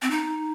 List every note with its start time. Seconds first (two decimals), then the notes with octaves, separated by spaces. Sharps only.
0.02 C4
0.11 D#4